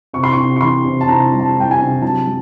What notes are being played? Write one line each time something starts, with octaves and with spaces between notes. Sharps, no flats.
C3 C#6
C6
C#6
C3
C#6
E3 C6
C3
A5
C3 A#5
G3
A5
G3 G5
G#5
C3
F#3 A5
F#3